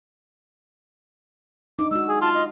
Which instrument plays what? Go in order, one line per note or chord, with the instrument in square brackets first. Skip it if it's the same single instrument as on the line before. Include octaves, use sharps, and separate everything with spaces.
[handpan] D4 D#4 [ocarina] D6
[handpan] G#3 F#4 [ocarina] E6
[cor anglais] G#4
[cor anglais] F4 [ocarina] A5
[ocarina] D#5